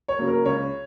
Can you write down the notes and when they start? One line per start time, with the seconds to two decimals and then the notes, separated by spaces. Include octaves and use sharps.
0.08 C#5
0.19 C#3 F#3 A#3
0.27 A#4
0.45 C#2 C#5